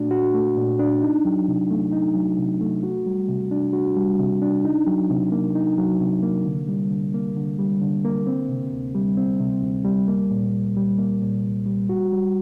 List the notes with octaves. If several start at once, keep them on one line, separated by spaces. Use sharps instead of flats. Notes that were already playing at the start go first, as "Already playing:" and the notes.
Already playing: A#2 A3 D4 F#4
F#4
A3
A#2
D4
D#4
F#3
C3
A3
D#4
F#3
C3
A3
F#4
G3
C3
D4
F#4
G3
C3
D4
D#4
F#3
C3
A#3
D#4
F#3
C3
A#3
D3
G3
D3
A#3
D3
G3
D3
A#3
C4
C3
D2
G3
C4
C3
D2
G3
A#3
A#2
C2
G3
A#3
A#2
C2
G3
F#4
G3